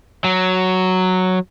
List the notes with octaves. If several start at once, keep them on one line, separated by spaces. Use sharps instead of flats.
F#3